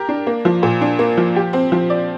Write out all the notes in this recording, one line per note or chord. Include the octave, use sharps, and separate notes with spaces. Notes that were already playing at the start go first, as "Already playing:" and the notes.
Already playing: G4 A#4
D4
A#3
F3
A#2
D4
A#3
F3
G4
C4
F3
D5